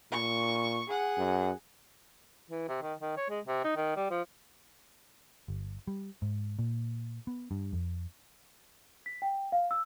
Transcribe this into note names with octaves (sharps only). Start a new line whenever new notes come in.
A#2 C#6
G#4 F#5
F#2
E3
C3
D#3
D#3
C#5
G#3
C3
D#4
D#3
G3
F3
G1
G3
G#2
A#2
B3
G2
F2
B6
G5
F5
E6